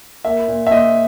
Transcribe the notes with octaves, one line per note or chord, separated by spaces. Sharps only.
A#3 E5
A#2
E5
A#2 D#5